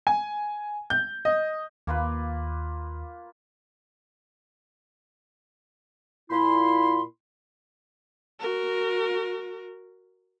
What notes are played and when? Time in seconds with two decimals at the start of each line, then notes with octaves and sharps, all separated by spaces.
0.07 G#5
0.90 G6
1.25 D#5
1.87 D#2 A#3 F4 B4
6.31 A#2 E4 B5 C6
8.40 F#4 A#4